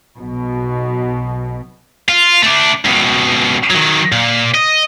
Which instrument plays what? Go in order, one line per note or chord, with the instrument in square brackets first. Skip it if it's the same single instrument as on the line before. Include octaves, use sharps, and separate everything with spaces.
[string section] B1 B2
[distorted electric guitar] F4
A3 D4
C#2 B2
D#3 F#3
A#2
D#5